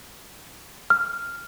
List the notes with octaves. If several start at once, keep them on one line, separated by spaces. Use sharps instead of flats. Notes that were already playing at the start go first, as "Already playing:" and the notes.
F6